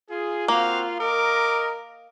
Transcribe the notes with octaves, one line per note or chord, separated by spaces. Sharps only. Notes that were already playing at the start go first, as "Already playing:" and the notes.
F4 G#4
A#3 C4 F#4 F5
A#4 D#5 A#5 D6